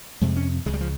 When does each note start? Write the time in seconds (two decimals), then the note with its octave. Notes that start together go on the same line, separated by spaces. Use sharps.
0.21 F2 C3 G#3
0.36 C#4
0.66 C#2 C#3 G#3
0.74 G3
0.81 F3